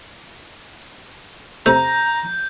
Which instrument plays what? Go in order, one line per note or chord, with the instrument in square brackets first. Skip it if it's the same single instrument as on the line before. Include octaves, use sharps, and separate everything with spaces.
[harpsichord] C3 A3 E5 [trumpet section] A#5 [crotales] G6